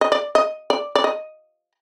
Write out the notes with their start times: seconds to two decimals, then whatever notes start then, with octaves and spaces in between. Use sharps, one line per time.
0.01 D#5
0.12 D5
0.35 D#5
0.70 D5
0.95 D5
1.04 D#5